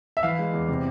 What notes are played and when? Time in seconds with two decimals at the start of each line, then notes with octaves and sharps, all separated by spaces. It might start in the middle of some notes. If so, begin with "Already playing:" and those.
0.17 E5
0.23 E3 F5
0.38 G#3
0.53 E2
0.68 C3